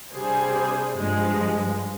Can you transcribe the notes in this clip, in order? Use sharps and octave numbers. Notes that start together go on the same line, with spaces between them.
C3 G3 D4 G#4 C5
G2 F3 G#3